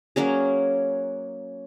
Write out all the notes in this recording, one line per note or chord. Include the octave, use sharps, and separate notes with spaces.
F#3 A#3 C#4 G#4